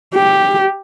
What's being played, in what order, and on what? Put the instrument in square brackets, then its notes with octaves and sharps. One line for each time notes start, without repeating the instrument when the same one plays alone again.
[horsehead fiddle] G4